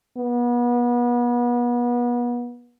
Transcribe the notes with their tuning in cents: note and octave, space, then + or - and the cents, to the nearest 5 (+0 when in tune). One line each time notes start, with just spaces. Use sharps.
B3 -35